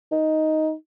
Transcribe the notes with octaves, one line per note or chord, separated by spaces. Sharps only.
D#4